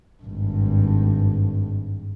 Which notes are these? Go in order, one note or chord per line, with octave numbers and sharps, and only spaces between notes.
G#1 G2